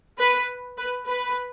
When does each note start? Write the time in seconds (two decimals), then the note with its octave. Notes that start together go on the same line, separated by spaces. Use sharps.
0.19 B4
0.78 B4
1.07 B4